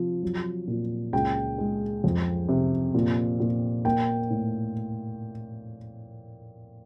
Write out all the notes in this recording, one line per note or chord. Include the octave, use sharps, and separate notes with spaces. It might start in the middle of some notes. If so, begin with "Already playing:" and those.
Already playing: C3 F3
F#3
A#2
C#2 G5
G#3
F2
C3
A#2
A#2
A#3 G5
A2